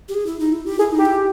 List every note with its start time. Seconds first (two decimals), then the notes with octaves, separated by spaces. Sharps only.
0.09 G4
0.14 G#4
0.26 E4
0.39 D#4
0.52 E4
0.66 G4
0.79 E4 G#4
0.92 D#4
0.98 G4
1.06 E4